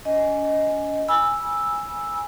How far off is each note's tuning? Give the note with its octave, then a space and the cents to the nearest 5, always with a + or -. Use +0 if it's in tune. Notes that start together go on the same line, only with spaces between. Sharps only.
C#4 +40 D#5 +0 G#5 +5
G#5 -5 B5 -30 E6 +0